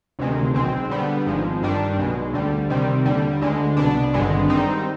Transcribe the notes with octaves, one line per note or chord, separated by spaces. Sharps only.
D2 C3 D#3 G#3
B1 B2 G#3 C4
D3 G3 B3
G#1 G#2 F3 G#3
G2 D#3 G3 D4
B1 B2 G#3
D2 D3 G3
C3 D#3 G3
D#2 D3 G3
D2 D3 G#3
C2 B2 B3 D4
G#1 G2 D3 G#3 B3
G#2 D#3 G3 C4 D#4